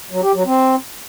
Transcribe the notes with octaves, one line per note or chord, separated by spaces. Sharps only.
F#3
G4
F#3
C4